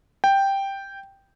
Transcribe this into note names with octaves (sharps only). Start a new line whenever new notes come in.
G5